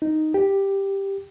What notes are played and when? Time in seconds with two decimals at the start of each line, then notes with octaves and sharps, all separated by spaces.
0.02 D#4
0.34 G4